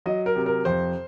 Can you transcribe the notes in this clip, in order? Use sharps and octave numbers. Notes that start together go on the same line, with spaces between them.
F#3 D#5
A#4
C3
A#4
F2 C5